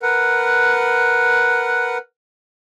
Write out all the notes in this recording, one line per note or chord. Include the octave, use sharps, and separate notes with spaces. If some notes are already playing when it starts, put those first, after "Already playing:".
A#4 B4 F#5